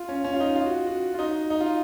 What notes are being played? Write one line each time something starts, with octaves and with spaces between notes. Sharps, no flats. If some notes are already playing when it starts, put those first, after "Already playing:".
Already playing: F4
C#4
C#4
F4
D#4
F4
F#4
F#4
F4
D#4
D#4
F4